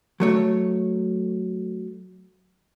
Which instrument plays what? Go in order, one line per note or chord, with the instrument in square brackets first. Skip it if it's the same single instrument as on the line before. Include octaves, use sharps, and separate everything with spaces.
[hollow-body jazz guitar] F#3 A3 C#5